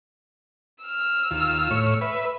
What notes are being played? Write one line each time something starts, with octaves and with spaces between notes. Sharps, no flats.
E6 F6
D#2 F4
A2 C#5
B4 E5